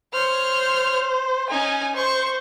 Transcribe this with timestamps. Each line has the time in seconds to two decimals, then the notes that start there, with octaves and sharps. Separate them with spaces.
0.13 C5 C#5 F6
1.50 C#4 D#4 G#5
1.96 C5 C#6